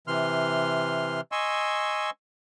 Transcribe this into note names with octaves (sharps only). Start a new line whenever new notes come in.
C3 E3 C6 F6
D#5 G#5 C6 C#6 E6